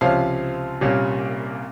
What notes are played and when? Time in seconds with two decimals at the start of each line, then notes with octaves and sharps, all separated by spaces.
0.01 C#2 C3 F3 C#5 F5
0.81 C2 A#2 G3 A#3 C#4